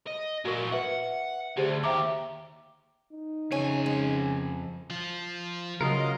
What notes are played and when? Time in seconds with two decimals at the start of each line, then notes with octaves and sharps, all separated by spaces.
0.07 D#5
0.45 A#2 F#3 F#4 A#4
0.72 B4 E5 F#5
1.57 D2 G4 G#4 C5
1.84 D#2 G4 E5 A#5 D6
3.13 D#4
3.52 F2 C#3 E3 C#5 G#5
3.86 G#3
4.90 F3 F4
5.81 C#3 F#3 F4 A#4 D#5